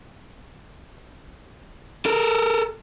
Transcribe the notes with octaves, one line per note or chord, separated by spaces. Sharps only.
A4 A#4